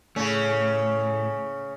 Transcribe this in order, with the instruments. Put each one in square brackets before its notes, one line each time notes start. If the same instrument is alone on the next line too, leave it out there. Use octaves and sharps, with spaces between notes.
[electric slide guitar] A2 A3 [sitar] C#3 C#4